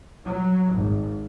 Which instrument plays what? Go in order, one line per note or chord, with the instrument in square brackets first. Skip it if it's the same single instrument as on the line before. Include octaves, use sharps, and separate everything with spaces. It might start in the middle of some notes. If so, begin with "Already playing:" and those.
[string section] F#3
G#1